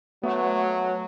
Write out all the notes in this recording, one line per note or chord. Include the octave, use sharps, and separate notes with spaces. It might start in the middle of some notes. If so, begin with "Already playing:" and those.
F#3 A3 B3